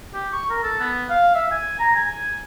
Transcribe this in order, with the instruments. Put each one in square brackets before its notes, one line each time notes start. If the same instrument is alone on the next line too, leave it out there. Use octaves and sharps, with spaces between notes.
[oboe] G4
C#6
A#4
A4
B3
F5
E5
G#5
A#5
G#5